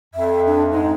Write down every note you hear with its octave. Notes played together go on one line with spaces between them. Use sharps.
F2 E5
D4
G#2 G#3 D#4